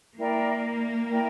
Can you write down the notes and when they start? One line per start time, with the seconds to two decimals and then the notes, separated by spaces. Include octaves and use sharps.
0.17 A#3 E4 A#4 D5 G5
1.10 E4 A#4 D5 G5